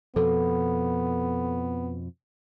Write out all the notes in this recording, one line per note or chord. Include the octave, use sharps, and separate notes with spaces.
F2 B2 F3 B3 A4